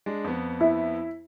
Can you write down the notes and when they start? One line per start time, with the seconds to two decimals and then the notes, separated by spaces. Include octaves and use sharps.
0.06 G#3 D4
0.24 F2 B3
0.61 E4